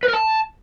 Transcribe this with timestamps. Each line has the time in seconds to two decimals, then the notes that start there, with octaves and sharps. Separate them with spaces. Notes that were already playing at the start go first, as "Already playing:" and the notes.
0.03 B4
0.08 A#4
0.14 A5